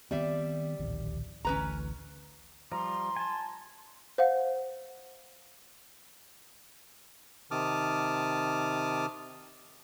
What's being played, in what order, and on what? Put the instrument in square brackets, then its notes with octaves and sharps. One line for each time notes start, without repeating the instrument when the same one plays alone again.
[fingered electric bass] D#3 B3 C4 [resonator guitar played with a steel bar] G3 D5 E5
[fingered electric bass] D1 A#1 D#2
[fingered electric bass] A1 D2 A2 [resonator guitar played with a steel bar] C#4 B4 A#5
[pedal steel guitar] F3 G3 [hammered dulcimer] A#5 [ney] C6
[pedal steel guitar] G#5 A5
[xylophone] C5 F5 F#5
[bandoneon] C3 D#3 A5 D6 D#6 F6